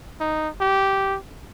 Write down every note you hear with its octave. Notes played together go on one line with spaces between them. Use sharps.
D#4
G4